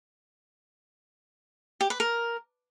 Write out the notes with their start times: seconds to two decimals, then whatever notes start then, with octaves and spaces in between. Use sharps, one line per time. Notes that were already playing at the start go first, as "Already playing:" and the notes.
1.81 G4
1.90 B4
2.00 A#4